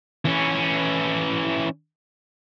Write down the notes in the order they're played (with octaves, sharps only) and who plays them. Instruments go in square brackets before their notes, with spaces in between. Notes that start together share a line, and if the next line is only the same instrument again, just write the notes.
[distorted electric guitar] E3 C#4